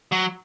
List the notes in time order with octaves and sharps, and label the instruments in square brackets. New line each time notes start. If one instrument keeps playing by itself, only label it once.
[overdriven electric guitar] F#3